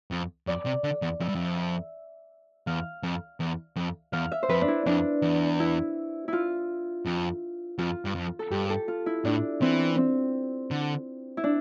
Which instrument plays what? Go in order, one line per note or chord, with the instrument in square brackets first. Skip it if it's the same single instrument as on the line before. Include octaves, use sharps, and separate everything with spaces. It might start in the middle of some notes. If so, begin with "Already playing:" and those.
[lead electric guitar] F2
[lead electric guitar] F2 [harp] D5
[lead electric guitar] C3
D3
E2
[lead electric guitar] F2 [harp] E5
[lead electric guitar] G2
F2
[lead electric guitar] E2 [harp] F5
[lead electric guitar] F2
E2
F2
[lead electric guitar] E2 [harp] F5
[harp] E5
C5
[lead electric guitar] F2 [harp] B4
[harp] D4
E4
[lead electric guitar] F2 [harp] D4
[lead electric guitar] E2
[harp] E4
E4 F4
[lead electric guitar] F2
[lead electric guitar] F2 [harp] F4
[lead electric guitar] G2
F2
[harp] A4
[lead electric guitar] G2 [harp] G4
[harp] A4
F4
E4
[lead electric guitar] A2 [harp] D4
[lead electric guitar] E3 [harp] C4
[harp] C4
[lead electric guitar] D3
[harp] E4
D4